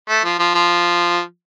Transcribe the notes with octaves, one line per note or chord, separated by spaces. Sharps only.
A3
F3
F3
F3